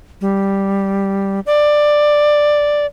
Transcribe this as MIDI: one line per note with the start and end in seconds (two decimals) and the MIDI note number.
0.21 1.40 55
1.46 2.86 74